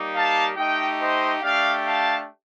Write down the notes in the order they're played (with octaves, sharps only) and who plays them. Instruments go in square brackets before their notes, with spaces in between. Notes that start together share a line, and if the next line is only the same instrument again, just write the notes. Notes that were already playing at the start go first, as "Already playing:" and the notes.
Already playing: [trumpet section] G3 A#3 D#4 G4
F5 A5
A3 D#4 G4 D#5 G5
C5 D#5
A3 D4 G4 D5 F5
F5 A5